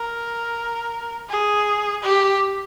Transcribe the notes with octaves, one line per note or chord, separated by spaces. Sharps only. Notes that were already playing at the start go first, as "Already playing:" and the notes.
Already playing: A#4
G#4
G4